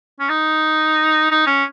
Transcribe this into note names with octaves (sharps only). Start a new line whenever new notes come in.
C#4
D#4
D#4
C#4